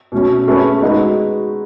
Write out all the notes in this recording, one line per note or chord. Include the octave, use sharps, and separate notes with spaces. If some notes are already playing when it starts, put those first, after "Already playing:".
B2 A3 C#4
A3 C#4 G#4 B4
G#3 D#4 F#4 B4